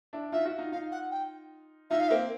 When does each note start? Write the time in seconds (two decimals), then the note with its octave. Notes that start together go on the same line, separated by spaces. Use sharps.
0.13 D4 E4
0.32 D#4 F4 E5
0.45 E4 F#4
0.58 D#4 F4
0.72 D#4 F4 F5
0.92 F#5
1.11 G5
1.90 D#4 F4 E5
2.00 F5
2.09 A#3 C4 E5